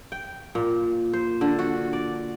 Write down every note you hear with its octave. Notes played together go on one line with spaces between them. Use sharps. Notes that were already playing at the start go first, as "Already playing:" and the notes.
G5
A#2
C5
D3
F#4
D5